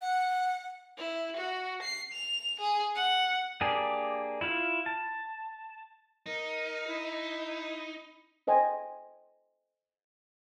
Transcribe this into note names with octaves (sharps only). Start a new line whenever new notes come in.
F#5
E4
F#4
C7
F7
G#4
F#5
A#3 D4 G4 G#4
E4 F4 F5
A5
D#4 A#4
E4
A4 C5 D#5 G5 G#5